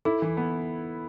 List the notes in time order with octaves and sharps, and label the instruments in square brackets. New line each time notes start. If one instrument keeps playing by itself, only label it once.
[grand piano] E4 [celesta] A4
[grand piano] E3
B3